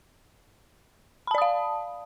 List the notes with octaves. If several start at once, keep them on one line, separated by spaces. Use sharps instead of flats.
D5 F5 A5 B5 D#6